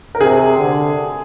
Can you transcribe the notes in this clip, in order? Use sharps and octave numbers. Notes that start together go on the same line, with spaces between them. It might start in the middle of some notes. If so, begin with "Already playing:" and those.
A#4
C3 G#4
D3